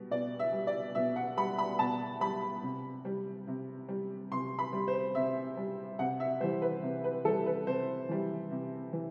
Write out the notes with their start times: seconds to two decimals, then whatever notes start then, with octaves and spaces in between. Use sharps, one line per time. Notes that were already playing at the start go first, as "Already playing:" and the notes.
Already playing: B2 G3
0.11 B2 D5
0.39 E5
0.53 G3
0.67 D5
0.95 B2 E5
1.16 F#5
1.37 G3 B5
1.58 B5
1.79 B2 A5
2.21 G3 B5
2.63 C3
3.05 G3
3.47 C3
3.88 G3
4.32 C3 C6
4.59 B5
4.73 G3
4.88 C5
5.15 C3 E5
5.57 G3
5.99 C3 F#5
6.20 E5
6.40 G3 C5
6.43 E3
6.62 B4
6.83 C3
7.04 B4
7.25 E3 A4
7.28 G3
7.46 B4
7.67 C3 C5
8.09 E3 G3
8.51 C3
8.93 E3